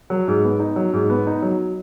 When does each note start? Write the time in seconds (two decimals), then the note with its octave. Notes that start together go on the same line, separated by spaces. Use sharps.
0.10 F#3
0.28 G#2
0.44 B3
0.60 D#4
0.76 F#3
0.93 G#2
1.10 B3
1.27 D#4
1.42 F#3